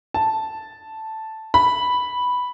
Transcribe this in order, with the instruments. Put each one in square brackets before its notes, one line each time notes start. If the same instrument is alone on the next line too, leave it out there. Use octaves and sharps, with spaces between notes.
[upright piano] A5
B5